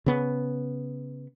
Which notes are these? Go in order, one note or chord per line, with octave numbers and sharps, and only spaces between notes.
C#3 B3